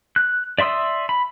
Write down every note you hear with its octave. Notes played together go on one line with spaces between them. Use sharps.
F#6
D5 E5 C6 D#6 E6
B5